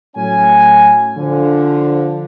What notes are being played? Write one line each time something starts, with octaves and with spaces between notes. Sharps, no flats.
A2 F#3 C#4 G#5
D3 F3